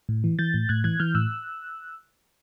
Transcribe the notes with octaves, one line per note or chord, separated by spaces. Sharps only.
A2
E3
E3 G6 A6
A2
A2 F#6 G#6
E3 F#6 G#6
E3 F6 G6
A2 E6 F#6